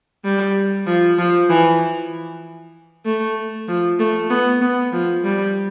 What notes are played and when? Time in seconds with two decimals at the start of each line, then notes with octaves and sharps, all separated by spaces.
0.25 G3
0.87 F3
1.18 F3
1.49 E3
3.05 A3
3.68 F3
3.99 A3
4.30 B3
4.61 B3
4.93 F3
5.24 G3